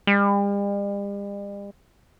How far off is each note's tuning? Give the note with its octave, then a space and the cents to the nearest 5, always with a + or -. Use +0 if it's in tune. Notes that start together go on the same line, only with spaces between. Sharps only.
G3 +45